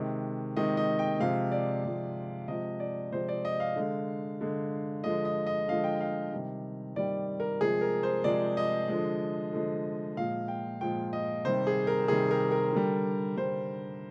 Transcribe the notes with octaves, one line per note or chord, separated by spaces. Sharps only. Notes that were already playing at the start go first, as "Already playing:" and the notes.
Already playing: C3 D#3 G#3
C3 D#3 G#3 D#5
D#5
G5
C3 F3 G#3 F5
D5
C3 F3 G#3
C3 F3 G#3 D#5
D5
C3 F3 G#3 C5
D5
D#5
F5
D3 G#3
D3 G#3
D3 F3 G#3 D#5
D#5
D#5
D3 F3 G#3 F5
G5
F5
C3 D#3 G3
C3 D#3 G3 D5
A#4
C3 F3 G#3 G#4
A#4
C5
C3 F3 G#3 D5
D#5
D3 F3 G#3
D3 F3 G#3
A#2 F3 G#3 F5
G5
A#2 F3 G#3 G5
D#5
C3 D#3 G3 C5
G#4
A#4
C3 D#3 G3 G#4
A#4
A#4
D3 G3
D3 G3 C5